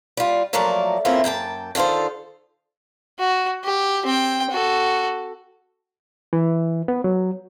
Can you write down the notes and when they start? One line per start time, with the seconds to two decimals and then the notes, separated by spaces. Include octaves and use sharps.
0.17 G3 F4
0.53 F3 F#3 A3 A#3 A#4 D5
1.05 A3 A#3 C4 C#4 E4 F4
1.24 F#2 A#3 G5 A5
1.75 D3 D#3 F4 A4 C5
3.20 F#4
3.64 G4
4.06 C4 G5
4.50 F#4 A4
6.33 E3
6.88 B3
7.04 F#3